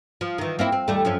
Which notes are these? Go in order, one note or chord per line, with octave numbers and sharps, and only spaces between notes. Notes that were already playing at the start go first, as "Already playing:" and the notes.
F3
D#3 E3
A#3 C4 E4
C4
D#2 G3 A3
F#2 F3 C#4